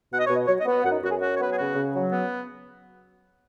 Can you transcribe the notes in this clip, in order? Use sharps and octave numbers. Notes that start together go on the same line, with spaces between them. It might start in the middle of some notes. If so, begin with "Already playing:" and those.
B2 F#5
D#5
B2 C#5
D#5
F#3 C#5
D#5
B3
F#5
F#2 F#5
D#4
F#2 F#4
G#4
F#3 F#4
C#5
B3 B4
G#4
C#3 F#4
C#3
F#3
B3